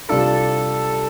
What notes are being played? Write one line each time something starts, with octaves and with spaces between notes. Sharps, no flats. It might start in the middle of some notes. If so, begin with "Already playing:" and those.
C2 C3 G3 D4 F4 A4